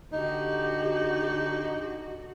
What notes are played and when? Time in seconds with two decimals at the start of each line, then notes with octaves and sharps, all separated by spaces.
0.12 D3 D#4 F#4 G4